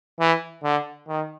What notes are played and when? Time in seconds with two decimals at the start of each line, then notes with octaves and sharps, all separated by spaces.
0.19 E3
0.63 D3
1.08 D#3